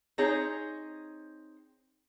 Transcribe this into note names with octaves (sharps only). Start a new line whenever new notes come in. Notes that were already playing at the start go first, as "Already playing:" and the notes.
C4 D#4 G#4 C#5